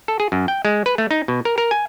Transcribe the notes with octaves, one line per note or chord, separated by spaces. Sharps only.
A4
G#4
F#2
G5
G#3
B4
A3
D#4
B2
A#4
A#4
G#5